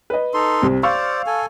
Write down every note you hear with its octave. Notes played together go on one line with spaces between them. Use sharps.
B4 D#5
D#4 A4 C6
C2 C4
C5 D5 F5 C#6 E6
A4 G#5